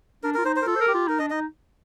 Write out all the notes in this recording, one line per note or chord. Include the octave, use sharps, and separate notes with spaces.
D4 A#4
F4 A#4
D#4 C5
C5
A#4
F4 A4
C5
A#4
G4
F4
D#4 A#4
D4 D#5
D#4 D#5